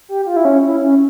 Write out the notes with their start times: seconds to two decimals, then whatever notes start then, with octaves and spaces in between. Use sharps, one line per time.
0.09 G4
0.26 F4
0.36 E4
0.45 C#4
0.63 E4
0.82 C#4